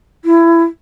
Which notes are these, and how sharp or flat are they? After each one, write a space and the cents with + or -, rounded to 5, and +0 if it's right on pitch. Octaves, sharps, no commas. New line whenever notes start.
E4 +25